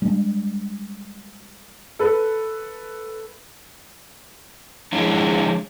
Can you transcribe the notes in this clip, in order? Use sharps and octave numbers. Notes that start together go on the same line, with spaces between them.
G3 G#3 D4
A4 B4
F3 G#3 D4 E4 G#4 C#5